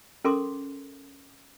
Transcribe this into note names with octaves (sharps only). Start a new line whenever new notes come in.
C#4 A4 A#4 C6 D6